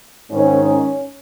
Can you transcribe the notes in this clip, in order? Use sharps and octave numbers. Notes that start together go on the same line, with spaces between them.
G#2 D#3 C#4
C#4